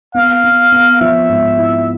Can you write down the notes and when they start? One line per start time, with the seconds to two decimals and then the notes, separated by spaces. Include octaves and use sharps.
0.15 B3 F5
0.44 B3
0.72 B3
1.01 F3 E5
1.29 G#2
1.57 E4